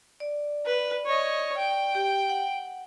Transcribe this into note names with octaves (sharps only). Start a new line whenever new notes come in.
D5
B4
C#5 D#5
G5
G4
F#5